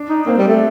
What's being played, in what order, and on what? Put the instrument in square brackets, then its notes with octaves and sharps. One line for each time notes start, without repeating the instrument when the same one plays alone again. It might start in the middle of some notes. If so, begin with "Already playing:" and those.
Already playing: [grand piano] D4
[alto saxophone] D#4
[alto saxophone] A#3 [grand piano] C4
[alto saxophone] G3
A3